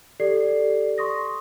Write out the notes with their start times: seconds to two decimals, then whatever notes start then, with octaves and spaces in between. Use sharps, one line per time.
0.20 G4 A4 D5 C7
0.98 C6 C#6 D#6 A#6